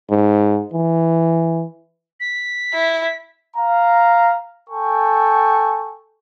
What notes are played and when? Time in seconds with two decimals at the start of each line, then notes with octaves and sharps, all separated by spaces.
0.10 G#2
0.73 E3
2.20 B6
2.74 E4
3.56 F5 A#5
4.69 A4 G5 G#5 C#6